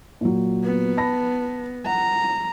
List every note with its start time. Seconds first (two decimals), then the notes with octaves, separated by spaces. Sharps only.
0.21 A#2 F#3
0.65 B3
0.97 A5 B5 A#6
1.86 F#5 A#5